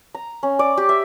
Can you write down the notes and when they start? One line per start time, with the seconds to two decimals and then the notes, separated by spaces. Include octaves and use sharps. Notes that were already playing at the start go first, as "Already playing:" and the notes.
0.15 A#5
0.43 C#4
0.59 D5
0.77 G4
0.89 E5